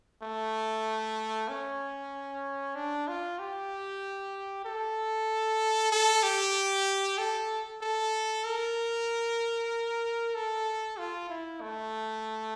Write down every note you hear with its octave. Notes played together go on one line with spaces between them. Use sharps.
A3
C#4
D4
F4
G4
A4
A4
G4
A4
A4
A#4
A4
F4
E4
A3